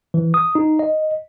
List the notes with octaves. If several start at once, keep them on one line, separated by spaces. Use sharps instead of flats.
E3
D#6
D#4
D#5